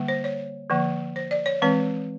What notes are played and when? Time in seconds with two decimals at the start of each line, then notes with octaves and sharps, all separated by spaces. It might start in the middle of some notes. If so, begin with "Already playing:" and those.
Already playing: D3 G3 A#3
0.08 C5
0.24 C#5
0.70 D3 F3 A#3
1.16 C5
1.31 D5
1.46 C#5
1.62 E3 G#3 C4 B4